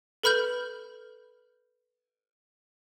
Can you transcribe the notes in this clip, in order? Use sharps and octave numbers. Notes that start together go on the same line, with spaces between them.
A4 B4 B5 F6 G6 F#7